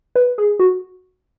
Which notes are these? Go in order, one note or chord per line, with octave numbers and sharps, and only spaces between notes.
B4
G#4
F#4